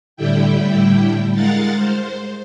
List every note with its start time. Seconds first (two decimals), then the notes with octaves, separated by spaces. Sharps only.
0.17 A2 D3 G3 E4 G5
1.34 G#3 A#4 F5 F#5 A6
1.75 C5